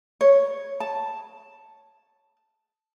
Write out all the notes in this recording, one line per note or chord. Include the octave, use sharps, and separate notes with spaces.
C#5
A5